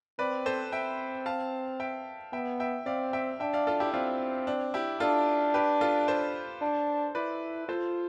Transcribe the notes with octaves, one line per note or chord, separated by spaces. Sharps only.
C4 B4 D5
A4 C5
C4 E5 G5
F5 A5
E5 G5
B3 E5 G5
E5 G5
C4 D5 F5
E5 G5
D4 E5 G5
D5 F5
F4 A4
E4 G4
C4 D4 F4
D4
E4 G4
D4 F4 A4
G4 B4
F4 A4
A4 C5
D4
E4 B4 D5
F4 A4 C5